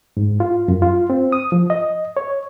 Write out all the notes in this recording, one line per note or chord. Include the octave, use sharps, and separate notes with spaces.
G#2
F4
F#2
F4
C4
D#6
F3
D#5
C#5